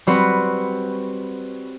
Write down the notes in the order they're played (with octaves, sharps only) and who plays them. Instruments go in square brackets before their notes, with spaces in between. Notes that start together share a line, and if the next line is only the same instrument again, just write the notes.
[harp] G3 C4 F#4 B4